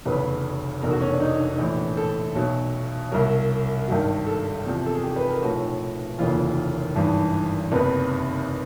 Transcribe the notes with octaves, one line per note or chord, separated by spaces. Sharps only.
F1 E2 C#3 F#3 B4
F1 E2 B2 A#4
F#4
C#4
D4
D#4
A#1 A2 E3
A4
B1 B2 F#3
C2 B2 F#3 A#4
G#1 G2 D#3 F#3
A4
E2 C3 F3
A4
G#4
G4
B4
A#4
B1 A2 F3 F#4
F1 D#2 C#3 E3 F4
G#1 G2 E3
F#1 E2 C3 B4